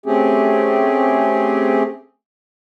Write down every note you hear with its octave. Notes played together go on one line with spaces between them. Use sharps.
A3 C4 C#4 G4 G#4